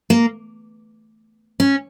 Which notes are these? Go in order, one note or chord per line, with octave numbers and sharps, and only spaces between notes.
A#3
C#4